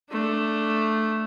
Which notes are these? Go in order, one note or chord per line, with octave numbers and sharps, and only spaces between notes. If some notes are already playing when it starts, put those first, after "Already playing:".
A3 D4